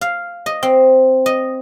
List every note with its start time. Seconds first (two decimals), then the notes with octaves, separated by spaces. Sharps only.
0.01 F5
0.46 D#5
0.63 C4
1.26 D#5